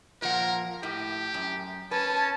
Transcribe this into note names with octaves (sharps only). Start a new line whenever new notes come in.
A#2 F3 A#4 F#5
A2 G4
F#2
C#4 B4 A5